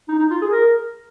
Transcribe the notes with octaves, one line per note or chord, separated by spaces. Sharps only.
D#4
D#4
F4
G#4
A#4